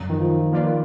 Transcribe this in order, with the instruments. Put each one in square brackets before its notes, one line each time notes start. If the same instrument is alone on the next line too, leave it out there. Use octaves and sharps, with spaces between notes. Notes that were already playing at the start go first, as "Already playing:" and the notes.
Already playing: [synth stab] F#2 D3 F#3
[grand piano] D#3
F3
[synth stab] F3 A#3 F4 B4 D5